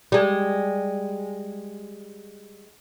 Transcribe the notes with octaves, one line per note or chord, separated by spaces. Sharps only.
G3 G#3